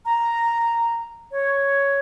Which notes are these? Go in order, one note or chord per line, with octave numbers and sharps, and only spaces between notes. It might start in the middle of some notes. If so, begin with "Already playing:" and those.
A#5
C#5